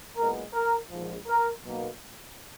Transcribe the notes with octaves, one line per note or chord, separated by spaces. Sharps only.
B1 A#2 G#3 B3 A#4
A#4
A#1 G#2 F3
A#4
B1 B2 A#3